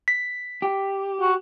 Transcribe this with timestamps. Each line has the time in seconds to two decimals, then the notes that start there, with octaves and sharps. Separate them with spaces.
0.08 B6
0.62 G4
1.21 F#4